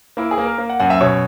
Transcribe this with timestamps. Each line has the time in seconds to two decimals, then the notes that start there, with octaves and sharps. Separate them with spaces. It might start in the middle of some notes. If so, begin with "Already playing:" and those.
0.17 A#3 E4
0.31 G#4
0.38 A#3
0.45 A#4
0.58 A#3
0.70 F#5
0.80 F#2 F#5
0.90 E5
1.01 B2 C#5